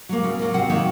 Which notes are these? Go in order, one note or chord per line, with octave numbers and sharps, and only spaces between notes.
F#3 A#3
C#3
F#3 A#3
C3 F#5
D#3 F#3 A#3